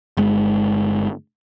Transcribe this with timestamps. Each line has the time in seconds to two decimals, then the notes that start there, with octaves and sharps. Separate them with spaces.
0.17 G1 G#3